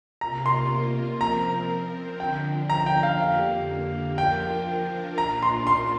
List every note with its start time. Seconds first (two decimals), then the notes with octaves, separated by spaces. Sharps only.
0.21 C3 A#3 F4 A#4 A#5
0.46 C6
1.20 F3 C4 A#4 A#5
2.20 D3 F3 D4 G5
2.70 A#5
2.86 G5
3.03 F5
3.19 F2 D3 A#3 G4
4.18 F3 D4 F4 A#4 G5
5.18 A#2 A#3 D4 F4 A#5
5.43 C6
5.67 C6